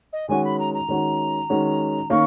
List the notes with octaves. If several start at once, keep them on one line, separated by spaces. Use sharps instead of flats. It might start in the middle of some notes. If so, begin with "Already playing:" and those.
D#5
D#3 G#3 C#4 F#4 G#5
B5
A#5
A#5
D#3 G#3 C#4 F#4
D#3 G#3 C#4 F#4
D#3 A#3 C#4 C#6